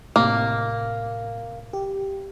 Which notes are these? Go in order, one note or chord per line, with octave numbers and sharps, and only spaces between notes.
A2 C3 A#3
G4